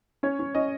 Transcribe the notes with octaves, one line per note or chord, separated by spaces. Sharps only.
C#4 C#5
C#4
C#4 D#5